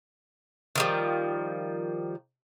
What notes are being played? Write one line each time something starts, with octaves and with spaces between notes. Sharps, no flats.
D#3 F3 G3